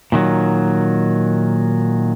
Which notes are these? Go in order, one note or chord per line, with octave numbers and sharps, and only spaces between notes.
A#2 D#3 F#3